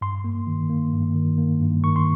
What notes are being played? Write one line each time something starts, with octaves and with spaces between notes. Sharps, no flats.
G2 C6
A#3
D#3
A#3
G2
D#3
A#3
G2
D#3 C#6
C6